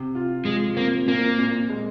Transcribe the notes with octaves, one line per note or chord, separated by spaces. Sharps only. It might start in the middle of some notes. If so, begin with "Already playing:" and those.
Already playing: C3
F4
F3 G#3
A#3 C4
A#2 A#3
A#2
G#3